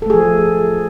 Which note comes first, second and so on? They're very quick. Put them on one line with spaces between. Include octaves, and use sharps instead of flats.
A4 A3 G#4 F3